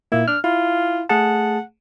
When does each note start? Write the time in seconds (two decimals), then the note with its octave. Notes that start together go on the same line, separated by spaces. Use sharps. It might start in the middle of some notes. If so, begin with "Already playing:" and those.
0.12 A#2 A#3 E4
0.28 D4 F6
0.44 E4 F4
1.09 A3 G#4 F#5 A5